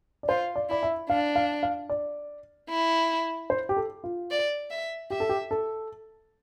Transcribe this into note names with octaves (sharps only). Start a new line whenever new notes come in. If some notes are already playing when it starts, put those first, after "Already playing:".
D5
F4 C5
D5
E4 D5
E5
D4 F5
F5
F5
D5
E4
C5
G4
A4
F4
D5
E5
G4 E5
A4
G4
A4